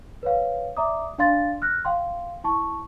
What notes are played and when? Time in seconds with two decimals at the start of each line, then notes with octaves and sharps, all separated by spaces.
0.23 B4 C#5 F5
0.77 D5 E5 A#5 D6 D#6
1.18 D4 D5 F5 C6 A6
1.62 F6 F#6 A#6
1.85 F5 G5 C6
2.44 E4 A5 C#6